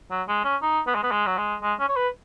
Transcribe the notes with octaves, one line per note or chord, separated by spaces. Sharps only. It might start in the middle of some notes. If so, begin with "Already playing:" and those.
F#3
G#3
C#4
D#4
B3
G#3
B3
G#3
F#3
G#3
G#3
C#4
C#5
B4